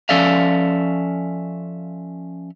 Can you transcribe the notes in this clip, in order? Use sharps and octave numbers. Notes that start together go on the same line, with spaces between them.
F3 C#4 A4 D5 E5 F5